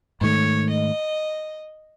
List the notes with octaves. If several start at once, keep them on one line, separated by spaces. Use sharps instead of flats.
G#2 D#3 A3 C#5
D#5